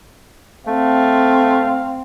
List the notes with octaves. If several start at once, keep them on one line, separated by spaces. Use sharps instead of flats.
A3 C4 F5